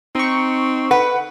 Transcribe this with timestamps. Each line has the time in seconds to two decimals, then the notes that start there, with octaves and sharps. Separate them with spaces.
0.15 C4 D#4 C#6
0.91 B4 F#5